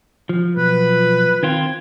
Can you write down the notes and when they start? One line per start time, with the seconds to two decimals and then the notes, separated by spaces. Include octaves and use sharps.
0.29 F3
0.57 B2 F#3 B4
1.43 D#3 C4 F4 G#6